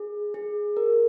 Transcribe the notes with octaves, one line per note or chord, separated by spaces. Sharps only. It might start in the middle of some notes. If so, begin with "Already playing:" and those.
Already playing: G#4
G#4
A#4